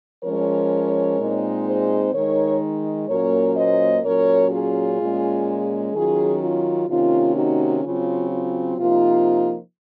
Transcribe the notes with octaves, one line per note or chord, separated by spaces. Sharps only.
F3 G#3 C#4 A#4 C#5
A#2 G#3 C4 D#4
G#4 C5
D#3 G#3 D#4 A#4 C#5
A#2 F#3 A#3 C#4 A#4 C#5
C5 D#5
A#2 F#3 C#4 A#4 C#5
F4 G#4
A#2 G#3 C#4
D#3 F#3 C#4 F4 G#4
F4
C3 D#3 A#3 C#4 F4
D#4 F#4
C#3 F#3 C4 F4
F4
C3 F3 A#3 D#4 F4